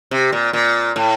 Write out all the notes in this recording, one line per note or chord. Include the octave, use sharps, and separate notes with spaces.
C3
A#2
A#2
A2